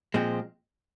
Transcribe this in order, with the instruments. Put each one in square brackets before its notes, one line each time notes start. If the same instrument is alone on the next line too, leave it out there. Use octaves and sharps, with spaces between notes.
[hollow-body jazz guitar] A#2 F3 G#3 C4